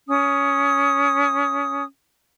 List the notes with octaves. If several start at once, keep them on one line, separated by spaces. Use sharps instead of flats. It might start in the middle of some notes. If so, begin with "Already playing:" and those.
C#4 D#6